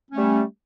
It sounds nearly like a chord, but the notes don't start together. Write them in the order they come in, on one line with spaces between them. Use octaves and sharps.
C#4 A3 G3